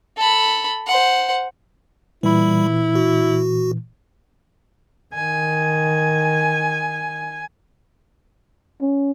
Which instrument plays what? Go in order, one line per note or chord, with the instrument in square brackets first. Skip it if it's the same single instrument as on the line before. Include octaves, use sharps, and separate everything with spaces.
[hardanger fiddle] A4 B5
C5 F#5
[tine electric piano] A#2 E3 [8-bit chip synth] G3 B5 [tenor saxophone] E4
[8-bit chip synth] F#4
[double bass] D#3 [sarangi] G#5
[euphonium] C#4